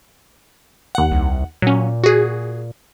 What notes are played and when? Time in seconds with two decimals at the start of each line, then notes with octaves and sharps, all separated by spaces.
0.95 D#2 F#5
1.12 C2
1.62 A#2 F#3 C#4
2.04 F#4 G#4